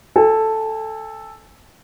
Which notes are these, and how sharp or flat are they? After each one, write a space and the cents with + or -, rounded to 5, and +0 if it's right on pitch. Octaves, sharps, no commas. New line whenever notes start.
A4 +0 G#5 -35